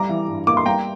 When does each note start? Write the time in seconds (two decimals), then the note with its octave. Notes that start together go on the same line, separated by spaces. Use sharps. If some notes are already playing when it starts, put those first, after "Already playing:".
Already playing: G3 A#5 D6
0.09 E3
0.28 G2
0.47 A#3 D6
0.57 C6
0.66 G3 G5 A#5